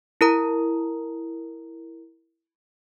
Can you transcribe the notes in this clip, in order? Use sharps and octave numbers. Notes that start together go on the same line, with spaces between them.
E4 A#4 A#5